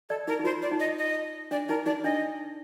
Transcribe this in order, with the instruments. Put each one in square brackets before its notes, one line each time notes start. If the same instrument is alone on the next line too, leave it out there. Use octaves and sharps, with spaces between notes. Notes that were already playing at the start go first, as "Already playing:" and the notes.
[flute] A4 [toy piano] D5
[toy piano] D#4 [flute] A#4
[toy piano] D#4
[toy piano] F4 [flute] C5
[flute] D5
[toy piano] D#4
[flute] D#5
D#5
[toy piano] D4 [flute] D5
[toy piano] D#4 [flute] A#4
[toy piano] D#4 [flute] D5
[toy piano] D4 [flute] D#5